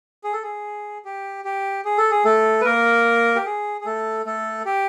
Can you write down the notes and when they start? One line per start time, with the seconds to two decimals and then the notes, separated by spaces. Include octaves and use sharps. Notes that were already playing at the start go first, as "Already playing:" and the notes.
0.24 G#4
0.33 A4
0.43 G#4
1.05 G4
1.44 G4
1.85 G#4
1.98 A4
2.11 G#4
2.25 A3 A4
2.61 B4
2.65 A#3 A#4
3.36 G4
3.46 G#4
3.81 G#4
3.86 A3 A4
4.25 A3 A4
4.66 G4